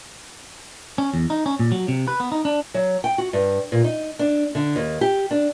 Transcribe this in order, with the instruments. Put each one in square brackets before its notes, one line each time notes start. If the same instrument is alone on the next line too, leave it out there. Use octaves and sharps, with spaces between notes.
[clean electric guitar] C#4
E2
D#4
C#4
A#2
F#3
C3
B4
B3
D#4
D4
[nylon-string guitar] F#3
G5
F#4
G2
A#2
D#4
D4
D3
D#2
G4
D4